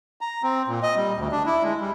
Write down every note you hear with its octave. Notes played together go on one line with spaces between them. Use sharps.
A#5
C4
A#2
D#5
G3
D2
D4
E4
G#3
G3